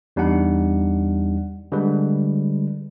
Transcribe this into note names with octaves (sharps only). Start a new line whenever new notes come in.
E2 G3 D4 D#4 F#5
D3 G3 G#3 B4